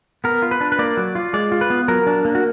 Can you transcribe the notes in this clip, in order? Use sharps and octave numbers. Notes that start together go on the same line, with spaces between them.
B3 A#4
F4
B4
D4
B4
A#3 D5
F#3
F4
G#3 D5
F4
B4
B3
F#3 A#4
D4
A#3
F#4